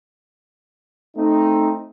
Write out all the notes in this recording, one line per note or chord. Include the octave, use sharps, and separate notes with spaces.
A3 C4 D#4